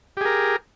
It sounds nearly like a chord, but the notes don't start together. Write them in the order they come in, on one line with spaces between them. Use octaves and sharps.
G4 G#4 A#4